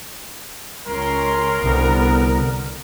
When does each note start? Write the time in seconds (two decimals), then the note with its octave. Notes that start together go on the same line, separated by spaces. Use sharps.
0.88 C#2 C#4 A#4 C6
1.63 C2 D3 B3